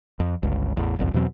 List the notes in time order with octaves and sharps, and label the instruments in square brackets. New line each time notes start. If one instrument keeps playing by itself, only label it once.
[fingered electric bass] F2
G1 C#2
A1 E2
G1 C2 F2
E2 B2 F#3 C4